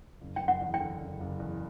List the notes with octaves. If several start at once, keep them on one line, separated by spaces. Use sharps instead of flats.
F#1
G5
F#1
F#5
E2
G5
D3
F#1
F#1
E2